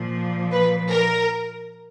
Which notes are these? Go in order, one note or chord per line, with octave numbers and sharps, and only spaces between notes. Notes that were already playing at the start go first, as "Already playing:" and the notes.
Already playing: A#2 F3
B4
A#4